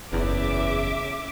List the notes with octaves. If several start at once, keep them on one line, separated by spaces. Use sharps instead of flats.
F#1 E2 C#3 E5 D6